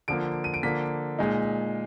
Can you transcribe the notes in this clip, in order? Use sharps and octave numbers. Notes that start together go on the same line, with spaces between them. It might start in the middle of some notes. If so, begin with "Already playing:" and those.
D3 F3 A#3 D7
D#7
D7
D3 F3 A#3 B6
A#2 G#3 D#4